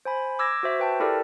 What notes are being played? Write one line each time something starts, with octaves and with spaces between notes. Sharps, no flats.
C5 G#5 B5
D6 E6 G#6 A#6
F#4 C5 E5
B4 G5 A5
E4 G4 A4 A#4 D5